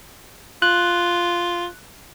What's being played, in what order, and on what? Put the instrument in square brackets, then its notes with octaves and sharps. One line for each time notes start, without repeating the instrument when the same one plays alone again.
[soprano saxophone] F4 [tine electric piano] F#6